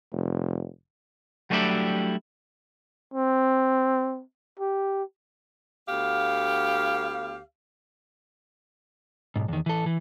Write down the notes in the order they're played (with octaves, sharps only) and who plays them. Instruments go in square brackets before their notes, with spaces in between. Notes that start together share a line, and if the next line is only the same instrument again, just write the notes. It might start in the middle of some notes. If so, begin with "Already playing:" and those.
[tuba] F1
[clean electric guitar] F#3 G3 A3 D4 E4 G4
[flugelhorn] C4
G4
[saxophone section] D2 B3 G4 F5
[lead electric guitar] B1 G#2
E2 D#3
E3 A4
E3